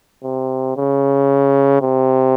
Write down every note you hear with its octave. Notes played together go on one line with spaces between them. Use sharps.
C3
C#3
C3